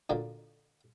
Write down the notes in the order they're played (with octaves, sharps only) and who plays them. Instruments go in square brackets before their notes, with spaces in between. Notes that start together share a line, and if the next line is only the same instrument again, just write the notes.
[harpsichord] D2 A#2 D3